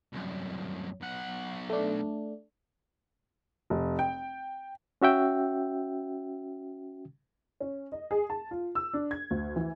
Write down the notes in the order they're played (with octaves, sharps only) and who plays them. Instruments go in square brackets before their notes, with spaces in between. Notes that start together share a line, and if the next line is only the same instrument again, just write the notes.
[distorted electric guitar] C2 F#2
B1 F#5
[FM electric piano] A3 D4
[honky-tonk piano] F1
G5
[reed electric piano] C#4 F#4 E5 G5
[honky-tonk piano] C#4
D#5
G#4
A5
F4
E6
D4
G#6
D2
E3